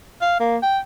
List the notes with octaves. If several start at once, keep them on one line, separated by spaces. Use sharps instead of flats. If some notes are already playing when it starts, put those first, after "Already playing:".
F5
A#3
G5